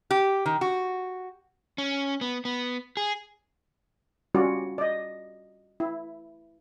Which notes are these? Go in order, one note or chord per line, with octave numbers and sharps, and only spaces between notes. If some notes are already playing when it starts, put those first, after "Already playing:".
G4
D#3
F#4
C#4
B3
B3
G#4
G3 C#4 F4 F#4 D5
D5 D#5
E4